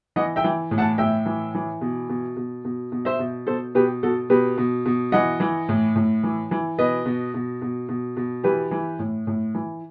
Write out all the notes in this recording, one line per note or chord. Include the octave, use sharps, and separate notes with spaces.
E3 D#5 F#5
E5 G5
E3
A2
F#5 A5
A2 E5 G5
E3
E3
B2
B2
B2
B2
B2
C5 E5
B2
B2 A4 C5
B2 G4 B4
B2 F#4 A4
B2 G4 B4
B2
B2
E3 D#5 F#5
E3
A2
A2
E3
E3
B2 B4 D#5
B2
B2
B2
B2
B2
E3 G4 B4
E3
A2
A2
E3